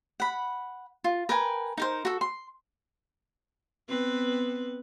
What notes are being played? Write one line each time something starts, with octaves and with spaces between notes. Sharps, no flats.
F#5 B5
F4
A#4 B4 G5 G#5
D#4 A#4 C5
F#4 A4
C6
B3 C4 B4